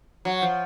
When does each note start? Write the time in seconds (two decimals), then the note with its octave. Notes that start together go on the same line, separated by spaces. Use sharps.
0.25 F#3
0.42 F3